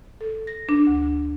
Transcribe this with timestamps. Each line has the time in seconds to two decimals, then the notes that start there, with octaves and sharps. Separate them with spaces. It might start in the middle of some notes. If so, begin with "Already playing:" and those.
0.21 A4
0.47 A#6
0.69 D4
0.87 D2